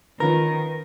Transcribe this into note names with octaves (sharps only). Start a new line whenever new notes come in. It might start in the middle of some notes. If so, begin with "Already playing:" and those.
D#3 C#4 F4 A#4 B4